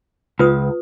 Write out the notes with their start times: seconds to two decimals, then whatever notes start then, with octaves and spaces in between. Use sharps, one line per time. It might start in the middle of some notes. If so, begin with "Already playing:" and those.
0.39 C#2 F4 B4 D#6